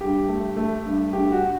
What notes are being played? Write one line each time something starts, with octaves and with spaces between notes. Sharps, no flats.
G2 G4
A3
A3
G2
G2 G4
F#4